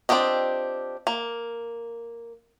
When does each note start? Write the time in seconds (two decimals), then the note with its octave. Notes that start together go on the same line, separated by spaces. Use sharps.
0.09 C4 D4 F4 G4 D#5
1.07 A#3